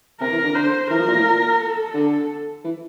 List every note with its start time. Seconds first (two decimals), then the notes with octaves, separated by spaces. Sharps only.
0.20 C3 A#4
0.32 E3
0.44 D3
0.55 D3 C5
0.90 E3 A#4
0.99 F3
1.07 A#2
1.16 A2
1.25 A#2
1.60 A4
1.94 D3
2.64 E3